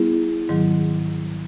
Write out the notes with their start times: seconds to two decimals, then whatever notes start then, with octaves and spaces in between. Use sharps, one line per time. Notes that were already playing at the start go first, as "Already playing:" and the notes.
Already playing: G3 B3 E4 G#4
0.49 G#2 D#3 F#3